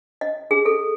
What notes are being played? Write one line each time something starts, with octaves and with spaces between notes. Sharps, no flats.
D#5
G#4
A4